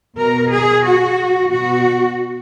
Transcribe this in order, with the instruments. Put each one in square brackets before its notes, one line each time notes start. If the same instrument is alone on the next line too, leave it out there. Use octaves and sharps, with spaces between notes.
[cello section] B2 A#4
G#4
F#4
B2 F#4